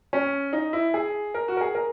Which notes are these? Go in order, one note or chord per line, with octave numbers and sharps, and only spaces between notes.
C#4
D#4
E4
G#4
A#4
F#4
A#4
G#4
A#4